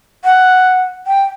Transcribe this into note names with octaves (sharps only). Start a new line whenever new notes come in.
F#5
G5